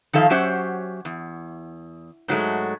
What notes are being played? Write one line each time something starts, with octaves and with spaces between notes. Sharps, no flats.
D#3 F3 A4 E5 F5
F#3 C#4 G4 C5 E5 F#5
E2
G#2 F#3 G#3 A3